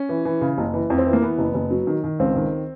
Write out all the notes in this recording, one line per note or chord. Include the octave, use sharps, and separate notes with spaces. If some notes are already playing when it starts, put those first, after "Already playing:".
Already playing: C#4
E3
E3
C#3
F#1
E3
F2
C4
E3
A#3
E3 B3
F#1
F#1
F#3
D#3
D#3
C#2 C4
D#3